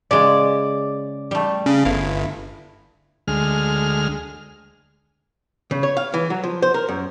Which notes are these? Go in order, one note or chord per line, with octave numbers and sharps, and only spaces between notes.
C#3 G#3 D5
G3 A3
C#3
G1 E4 F5
D2 G#3 F6
C#3
C#5
F5
E3
F#3
F3
C5
A#4
F#2